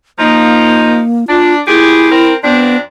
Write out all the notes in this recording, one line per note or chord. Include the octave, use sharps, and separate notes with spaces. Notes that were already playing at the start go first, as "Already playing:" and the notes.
F3 A#3 D#4
D4 F4
A#2 E4 G4 G#4
C4 A#4
F2 B3 C4 D4